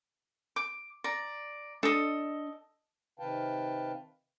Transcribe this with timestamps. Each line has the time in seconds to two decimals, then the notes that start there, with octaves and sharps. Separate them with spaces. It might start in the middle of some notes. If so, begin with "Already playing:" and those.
0.56 D6
1.04 D5 A#5
1.83 D4 A4 D#5
3.19 C3 D#3 B4 F5 G5 A5